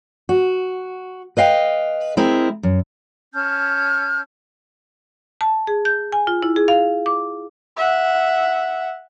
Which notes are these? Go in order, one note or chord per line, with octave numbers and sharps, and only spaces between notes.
F#4
B4 D#5 F5 G5
G#3 C4 E4 A#4
F#2
C#4 A5 F6 G6
A5
G#4
G6
G#5
F4
E4
G#4
F5
D6
E5 F#5